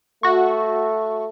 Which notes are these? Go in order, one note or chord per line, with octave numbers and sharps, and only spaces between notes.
A3 F#4 C#6